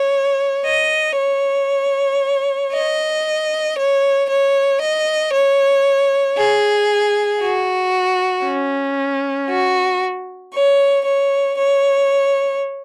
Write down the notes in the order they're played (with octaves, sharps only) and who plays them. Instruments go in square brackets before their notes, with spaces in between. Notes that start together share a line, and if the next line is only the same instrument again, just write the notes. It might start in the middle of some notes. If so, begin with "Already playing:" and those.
Already playing: [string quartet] C#5
D#5
C#5
D#5
C#5
C#5
D#5
C#5
G#4
F#4
C#4
F#4
C#5
C#5
C#5